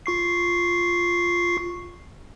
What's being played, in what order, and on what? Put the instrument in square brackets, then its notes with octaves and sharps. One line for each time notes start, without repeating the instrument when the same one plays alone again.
[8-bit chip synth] F4 C#6 C7